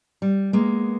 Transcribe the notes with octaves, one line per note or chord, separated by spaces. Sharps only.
G3
G#3 A#3 B3